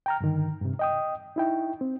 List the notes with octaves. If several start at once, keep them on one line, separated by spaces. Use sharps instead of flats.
G5 A#5 F6
G2 D3 D#3
G2 C3
D#5 G5 D#6
D#4 E4 G5
C4